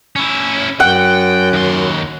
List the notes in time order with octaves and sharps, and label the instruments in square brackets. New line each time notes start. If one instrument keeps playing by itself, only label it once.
[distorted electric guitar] C#4 E4
[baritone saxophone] F#2 [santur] F#5 [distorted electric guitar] G5
[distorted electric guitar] D#2 C6